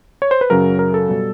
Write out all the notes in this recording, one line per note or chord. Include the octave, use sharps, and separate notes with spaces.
C#5
C5
B4
F#2 C#3 F#3 A#4
A#4
A4
B2 G3